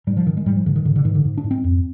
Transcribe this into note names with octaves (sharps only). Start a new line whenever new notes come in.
G#2 G3
F3
G#2 D#3
G#3
G#2 G3
F3
G#2 D3
D#3
G#2 D3
D3
G#2 D#3
D3
G#2
D4
G#2
C4
F2